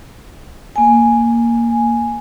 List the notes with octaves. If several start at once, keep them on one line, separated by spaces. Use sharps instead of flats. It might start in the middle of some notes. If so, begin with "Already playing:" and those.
A#3 G#5